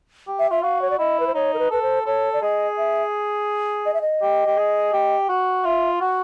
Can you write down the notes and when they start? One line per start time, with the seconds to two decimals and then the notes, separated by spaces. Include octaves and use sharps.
0.27 G4
0.39 E5
0.51 F4 E5
0.63 F#4 F5
0.82 C#5
0.90 D5
0.98 E4 D#5
1.20 B4
1.27 C5
1.34 D#4 C#5
1.54 A#4
1.59 B4
1.70 A4 B4
1.82 C5
2.06 A4 C#5
2.33 D5
2.42 G#4 D#5
2.78 E5
3.86 D#5
3.94 E5
4.01 D#5
4.22 G4
4.46 G4
4.57 G#4
4.93 G4
5.29 F#4
5.64 F4 E5
6.01 F#4 F#5